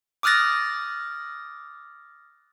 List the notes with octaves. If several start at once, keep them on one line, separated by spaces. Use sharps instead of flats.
D6 D#6 F6 F#6 A6 A#6